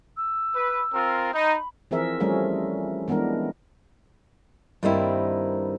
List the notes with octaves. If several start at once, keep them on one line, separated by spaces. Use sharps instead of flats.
E6
B4
C4 F4 A#4
D#4 B5
E3 F3 C4 G#4 A#4 E5
F3 G3 A3 C#4 G#4 A#4
E3 G#3 B3 D4 A#4
G2 D#3 G3 A#3 C4 E4